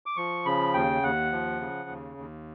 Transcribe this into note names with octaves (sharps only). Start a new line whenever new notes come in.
D6
F3 C#6
C#3 B5
D#2 G5
D#2 F#5
F3
C#3
D#2
D#2